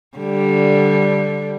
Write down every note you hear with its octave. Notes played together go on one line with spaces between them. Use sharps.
D3 G3